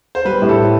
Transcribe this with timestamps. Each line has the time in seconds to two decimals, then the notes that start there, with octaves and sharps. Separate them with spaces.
0.15 C5
0.25 G3 B4
0.42 A2
0.49 A4